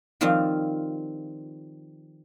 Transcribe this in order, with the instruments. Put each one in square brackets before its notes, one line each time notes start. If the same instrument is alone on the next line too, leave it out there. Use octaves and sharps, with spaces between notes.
[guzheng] D#3 F3 G3 C4 F4